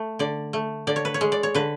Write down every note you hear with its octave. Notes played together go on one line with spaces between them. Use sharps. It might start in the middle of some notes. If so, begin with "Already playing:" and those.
Already playing: A3
D3 D5
A3
D3 D5
C#5
B4
C#5
G#3
D5
C#5
D3 B4